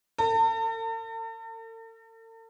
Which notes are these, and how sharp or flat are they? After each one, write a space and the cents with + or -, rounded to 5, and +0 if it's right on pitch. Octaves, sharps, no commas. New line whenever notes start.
A4 +45